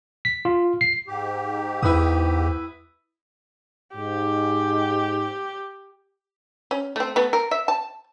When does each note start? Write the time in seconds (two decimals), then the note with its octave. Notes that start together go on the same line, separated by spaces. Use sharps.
0.25 B6
0.45 F4
0.81 C7
1.07 G#2 G4
1.83 E2 E4 B4 D#6
3.96 G#2 G4
6.71 C#4
6.96 A3 C4
7.16 A3 B3
7.33 A#4
7.51 E5
7.68 A5